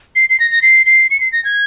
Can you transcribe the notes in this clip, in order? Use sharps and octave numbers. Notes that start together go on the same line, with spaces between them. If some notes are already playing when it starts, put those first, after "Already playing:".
C7
C7
A#6
A#6
C7
C7
C#7
C7
A#6
G#6